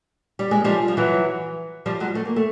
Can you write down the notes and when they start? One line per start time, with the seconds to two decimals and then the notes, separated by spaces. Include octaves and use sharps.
0.39 G3
0.51 G#3
0.64 F3 G3
0.88 F3
0.97 E3 F#3
1.86 F3 G3
2.00 F#3 G#3
2.15 A3
2.25 A#3
2.36 A3